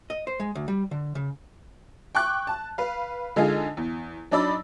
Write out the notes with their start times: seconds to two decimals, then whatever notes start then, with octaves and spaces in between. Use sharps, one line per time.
0.10 D#5
0.27 C5
0.40 G#3
0.55 D2
0.68 G3
0.91 D3
1.15 C#3
2.15 G5 C#6 D6 F#6
2.47 A5
2.78 B4 F5
3.36 D3 G#3 D#4 F4 G#4
3.77 E2
4.31 F#3 D4 D#4 D5 B5 E6